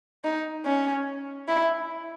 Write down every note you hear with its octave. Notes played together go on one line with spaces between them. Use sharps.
D#4
C#4
E4